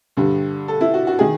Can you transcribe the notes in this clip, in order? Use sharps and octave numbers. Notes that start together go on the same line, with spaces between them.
G2 D3 G3
A4
E4
F#4
F#4
D#3 G#4